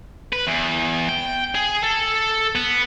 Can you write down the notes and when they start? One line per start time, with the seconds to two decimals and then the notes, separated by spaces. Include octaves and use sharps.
0.33 B4
0.47 E2
1.09 G5
1.55 G#4
1.83 A4
2.55 B3